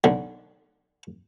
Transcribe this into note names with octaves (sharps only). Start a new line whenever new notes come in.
B1 D3